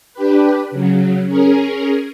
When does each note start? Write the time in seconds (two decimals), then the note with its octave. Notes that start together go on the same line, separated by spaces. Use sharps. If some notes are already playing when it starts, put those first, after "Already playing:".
0.14 D4 G4 B4
0.71 C#3 F#3
1.26 C#4 G#4 A#4